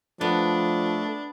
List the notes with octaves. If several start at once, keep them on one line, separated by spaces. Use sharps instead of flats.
F3 A3 B3 D4